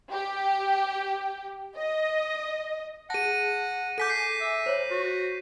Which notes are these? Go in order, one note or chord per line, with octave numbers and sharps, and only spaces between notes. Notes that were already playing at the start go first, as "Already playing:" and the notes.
G4
D#5
G#4 F#5 A5 A#6 D#7
A4 G#5 D6 G6 B6 D#7
G6 C7
E5
C5 C#5
F#4